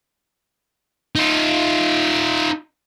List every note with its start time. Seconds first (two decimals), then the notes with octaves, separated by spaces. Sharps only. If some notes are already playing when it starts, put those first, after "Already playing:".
1.15 D#4 F4